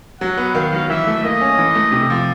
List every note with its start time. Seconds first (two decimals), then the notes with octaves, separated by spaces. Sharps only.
0.21 F#3 F#5
0.37 B3
0.55 D#3 F5
0.73 F#3
0.89 E3 E5
1.07 A3
1.23 A#3 D#5
1.41 C#4
1.58 E3
1.75 A3
1.92 C3
2.10 F3